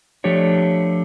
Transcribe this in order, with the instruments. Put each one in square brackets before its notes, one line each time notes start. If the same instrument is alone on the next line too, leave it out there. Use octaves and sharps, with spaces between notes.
[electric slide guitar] F3 A3 D4 G4 C#5